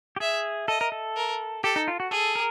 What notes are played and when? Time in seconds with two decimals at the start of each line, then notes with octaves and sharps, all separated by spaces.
0.16 G4
0.20 G#4 E5
0.68 A4 D#5
0.81 A#4
0.92 A4
1.16 A#4
1.64 G4 A4
1.76 D#4
1.88 F4
2.00 F#4
2.11 G#4 A4
2.35 A#4